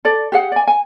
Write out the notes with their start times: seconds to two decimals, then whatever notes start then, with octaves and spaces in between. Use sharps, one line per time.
0.05 A4 D5
0.32 G4 G#4 F#5
0.52 D5 G#5
0.67 G#5